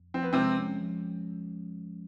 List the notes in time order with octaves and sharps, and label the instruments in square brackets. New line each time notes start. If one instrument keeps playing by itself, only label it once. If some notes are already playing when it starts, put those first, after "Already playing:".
Already playing: [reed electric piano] F2
[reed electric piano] F3 [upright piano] C4
[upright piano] B3
[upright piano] C3 C4 [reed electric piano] G#3
[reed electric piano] C#4
F3